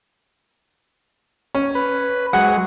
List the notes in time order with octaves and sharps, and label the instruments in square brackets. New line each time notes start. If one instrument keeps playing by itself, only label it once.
[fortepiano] C#4
[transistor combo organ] B4
[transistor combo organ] F#3 G#3 [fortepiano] F#5